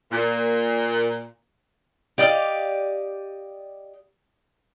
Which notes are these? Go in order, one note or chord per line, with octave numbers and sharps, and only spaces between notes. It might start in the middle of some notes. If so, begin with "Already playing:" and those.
A#2
G4 D5 D#5 F5